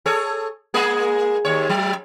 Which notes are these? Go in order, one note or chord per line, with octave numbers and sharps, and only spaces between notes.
G#4 A4 C#5
G#3 A#3 G#4
D#2 C#5
F#3